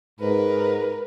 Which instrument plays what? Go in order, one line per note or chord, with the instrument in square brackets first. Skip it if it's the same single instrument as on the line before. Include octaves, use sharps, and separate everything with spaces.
[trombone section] G#2 [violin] A#4 B4